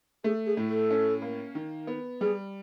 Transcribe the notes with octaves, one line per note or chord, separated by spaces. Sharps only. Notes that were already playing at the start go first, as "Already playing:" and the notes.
A3 G#4
G#4
A2
A4
C#4
A#3
D#3
B3
G3 G#4